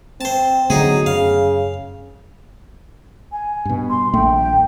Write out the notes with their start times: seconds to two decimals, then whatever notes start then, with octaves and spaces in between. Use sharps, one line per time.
0.21 C4 C5 A5
0.70 D3 F#3 A3 B3 D#4 G#4
1.06 F#2 C#3 F5
3.32 G#5
3.65 G2 B2
3.90 C6
4.13 D#1 A#1 A3 G5